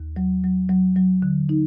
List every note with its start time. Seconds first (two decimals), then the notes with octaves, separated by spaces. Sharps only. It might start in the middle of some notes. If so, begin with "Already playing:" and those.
Already playing: D#2
0.16 F#3
0.44 F#3
0.69 F#3
0.96 F#3
1.22 D3
1.49 D#4